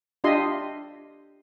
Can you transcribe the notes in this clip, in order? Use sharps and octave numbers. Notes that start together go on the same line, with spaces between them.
D4 F4 G4 D#5 E5 C6